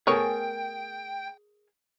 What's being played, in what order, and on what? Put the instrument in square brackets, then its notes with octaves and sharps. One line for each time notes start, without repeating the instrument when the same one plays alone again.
[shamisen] A3 B3 C#5 [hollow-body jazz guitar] G#4 A#4 G#5 [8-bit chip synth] G5